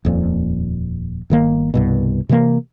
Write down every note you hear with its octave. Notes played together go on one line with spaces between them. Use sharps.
D#1 F2 A#2
G1 D#3 A#3
C2 G2 B2
C3 E3 F3 A#3